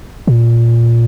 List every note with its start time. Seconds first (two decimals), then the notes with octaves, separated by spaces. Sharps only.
0.27 A#2